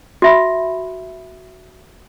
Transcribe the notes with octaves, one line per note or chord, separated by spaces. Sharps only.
F#4 E5 B5